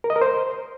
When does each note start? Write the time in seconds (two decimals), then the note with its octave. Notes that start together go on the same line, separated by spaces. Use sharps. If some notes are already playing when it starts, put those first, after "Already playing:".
0.04 A#4
0.10 D#5
0.16 A#4
0.22 C5